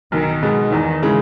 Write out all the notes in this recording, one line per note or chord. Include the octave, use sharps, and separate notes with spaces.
B1 D#3
B2 G#3 B3
E2 D#3
C#3 E3 G#3